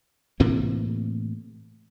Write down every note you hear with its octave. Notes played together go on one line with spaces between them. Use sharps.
A2 C3 E3 A#3